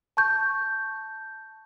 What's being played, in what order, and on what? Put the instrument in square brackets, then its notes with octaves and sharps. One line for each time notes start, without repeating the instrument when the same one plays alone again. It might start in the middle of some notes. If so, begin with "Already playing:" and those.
[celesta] A5 C#6 G6